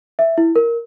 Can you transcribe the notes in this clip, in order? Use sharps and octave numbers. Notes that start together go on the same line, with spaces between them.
E5
E4
A#4